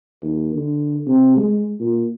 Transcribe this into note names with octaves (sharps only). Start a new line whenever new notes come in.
D#2
D3
C3
G#3
A#2